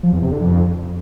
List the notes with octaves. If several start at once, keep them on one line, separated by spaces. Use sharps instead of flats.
F3
E2
C3
D3
F2